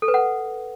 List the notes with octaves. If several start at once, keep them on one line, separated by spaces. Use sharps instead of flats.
A4
B4
F#5